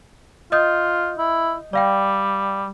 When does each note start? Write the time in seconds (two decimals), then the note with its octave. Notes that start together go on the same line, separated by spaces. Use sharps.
0.52 F4 D#5 D#6 G6
1.18 E4
1.73 G3 D5 F5 G5